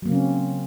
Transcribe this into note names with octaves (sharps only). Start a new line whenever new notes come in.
C#3 F#3 A#3 C4 C#4